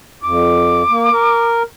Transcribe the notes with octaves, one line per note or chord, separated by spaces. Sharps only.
F2 D6
A#3
A#4